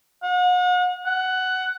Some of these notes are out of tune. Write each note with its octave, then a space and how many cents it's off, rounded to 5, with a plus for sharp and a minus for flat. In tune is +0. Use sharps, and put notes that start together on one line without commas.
F#5 -40
F#5 +10